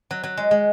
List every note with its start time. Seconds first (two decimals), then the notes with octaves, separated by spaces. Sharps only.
0.11 F#3
0.23 F#3
0.37 G#3
0.51 G#3